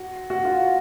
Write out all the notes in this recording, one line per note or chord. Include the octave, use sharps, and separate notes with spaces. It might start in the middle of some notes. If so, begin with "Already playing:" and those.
Already playing: F#4
F#4
F4